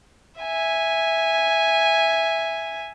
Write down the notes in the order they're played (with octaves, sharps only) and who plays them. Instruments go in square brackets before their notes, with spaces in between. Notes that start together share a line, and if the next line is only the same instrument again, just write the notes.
[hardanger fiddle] E5 G#5